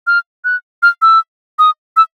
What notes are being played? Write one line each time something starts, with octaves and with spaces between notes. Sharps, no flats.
F6
F#6
F6
E6
D#6
E6